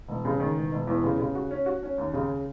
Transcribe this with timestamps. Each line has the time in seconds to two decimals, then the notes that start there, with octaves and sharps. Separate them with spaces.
0.09 E1
0.25 C#3
0.40 D#3
0.56 E1
0.72 E1
0.87 E2
1.04 C#3
1.19 C#3
1.35 F#4
1.51 C#4
1.66 F#4
1.83 C#4
1.98 D#2
2.13 C#3